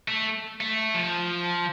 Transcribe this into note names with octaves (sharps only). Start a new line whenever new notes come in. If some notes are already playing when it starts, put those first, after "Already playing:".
A3
A3
F3